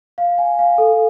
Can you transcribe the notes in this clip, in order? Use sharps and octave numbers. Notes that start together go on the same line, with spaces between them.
F5
G#5
F5
A4